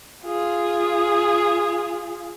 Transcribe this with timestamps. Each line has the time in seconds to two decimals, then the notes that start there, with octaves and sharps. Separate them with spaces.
0.25 F4 G#4